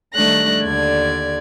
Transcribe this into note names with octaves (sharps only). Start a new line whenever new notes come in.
D#3 G3 A3 D4 F#6 A#6
D#2 D3 D5 G#6